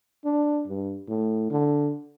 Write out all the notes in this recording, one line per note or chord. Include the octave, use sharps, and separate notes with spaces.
D4
G2
A2
D3